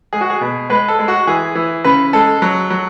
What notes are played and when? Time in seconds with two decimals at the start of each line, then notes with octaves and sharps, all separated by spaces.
0.13 G#3 G#4
0.21 F#4
0.30 G#4
0.41 B2
0.70 G#3 B4
0.88 A4
0.99 G#3
1.08 F#4
1.27 E3 G#4
1.55 E3
1.84 C#3 B4
2.13 G#3 A4
2.42 F#3
2.70 F#3